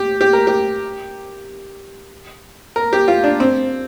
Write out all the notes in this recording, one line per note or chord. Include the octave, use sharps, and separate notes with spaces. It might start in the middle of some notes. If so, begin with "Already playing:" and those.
Already playing: G4
G4
A#4
G4
A#4
G4
F4
D4
C4